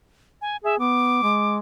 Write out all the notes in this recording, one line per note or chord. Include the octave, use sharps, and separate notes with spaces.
G#5
G#4 E5
B3 D6
G#3